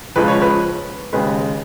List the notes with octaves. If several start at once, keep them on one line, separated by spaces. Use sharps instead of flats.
C#2 C#3 F3 G#3 B4
C#5
B4
D#2 C#3 G#3 B4